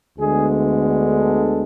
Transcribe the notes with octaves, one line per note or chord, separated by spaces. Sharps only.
D2 D3 G#3 B3 G#4
A4